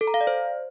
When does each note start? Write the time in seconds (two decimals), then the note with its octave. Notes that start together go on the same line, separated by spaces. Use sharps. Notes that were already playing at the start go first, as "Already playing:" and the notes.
0.01 A4
0.07 A#5
0.14 F5
0.21 D5
0.27 C5